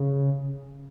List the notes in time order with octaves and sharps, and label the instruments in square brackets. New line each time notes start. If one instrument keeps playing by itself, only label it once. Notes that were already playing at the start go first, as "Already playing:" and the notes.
Already playing: [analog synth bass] C#3